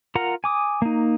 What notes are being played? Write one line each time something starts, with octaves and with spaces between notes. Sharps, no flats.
F4 A#4 F#5 A#5
G#5 D6 D#6
A#3 D#4